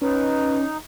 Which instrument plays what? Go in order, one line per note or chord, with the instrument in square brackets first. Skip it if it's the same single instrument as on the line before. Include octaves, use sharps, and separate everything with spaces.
[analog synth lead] C#4 [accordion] D#4 [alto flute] B4